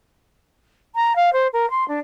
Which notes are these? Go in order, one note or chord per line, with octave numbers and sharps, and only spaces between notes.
A#5
F5
C5
A#4
C6
D4